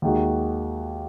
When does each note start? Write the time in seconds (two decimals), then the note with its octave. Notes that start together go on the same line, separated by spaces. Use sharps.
0.02 D#2 D#3 G#3 F#4